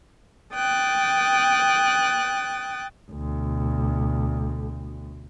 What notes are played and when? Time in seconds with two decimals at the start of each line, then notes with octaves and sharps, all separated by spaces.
0.53 G5 D#6 F#6 A6
3.10 D2 B2